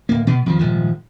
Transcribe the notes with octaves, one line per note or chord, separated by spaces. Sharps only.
D1 A#3
B2 B3
F2 D#3 F3
D#1 G#2 F3